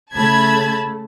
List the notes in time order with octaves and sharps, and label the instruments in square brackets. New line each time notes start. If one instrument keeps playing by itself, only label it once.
[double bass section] C#3 A3 [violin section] A5 B5 G#6